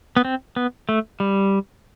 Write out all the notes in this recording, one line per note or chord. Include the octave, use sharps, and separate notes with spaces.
B3
C4
B3
A3
G3